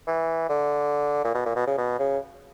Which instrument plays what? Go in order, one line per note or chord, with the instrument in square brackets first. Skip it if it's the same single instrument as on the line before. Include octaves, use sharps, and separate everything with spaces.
[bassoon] E3
D3
A#2
B2
A#2
B2
C#3
B2
C#3